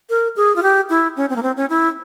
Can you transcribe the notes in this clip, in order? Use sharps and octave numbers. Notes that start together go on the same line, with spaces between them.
A#4
G#4
F4
G4
E4
C#4
C4
A#3
C4
C#4
E4